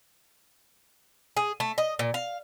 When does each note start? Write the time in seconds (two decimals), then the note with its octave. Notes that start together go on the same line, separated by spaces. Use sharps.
1.37 G#4
1.60 A3
1.78 D#5
1.99 A#2
2.14 F5